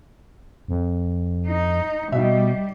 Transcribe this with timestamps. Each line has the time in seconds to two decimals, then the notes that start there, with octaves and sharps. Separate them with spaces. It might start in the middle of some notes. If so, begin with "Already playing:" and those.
0.68 F2
1.46 D#4
2.12 B2 G3 D#4 E5